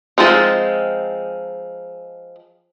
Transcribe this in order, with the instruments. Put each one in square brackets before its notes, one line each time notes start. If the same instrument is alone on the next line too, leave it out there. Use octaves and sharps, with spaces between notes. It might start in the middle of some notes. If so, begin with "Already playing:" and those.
[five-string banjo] F3 G#3 C4 D#4